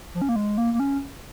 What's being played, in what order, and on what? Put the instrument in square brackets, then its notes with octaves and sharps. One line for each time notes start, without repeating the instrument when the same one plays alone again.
[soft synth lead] F3
C#4
A#3
G#3
A#3
A#3
C#4